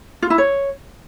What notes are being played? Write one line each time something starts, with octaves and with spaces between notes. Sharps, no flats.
F4
E4
C#5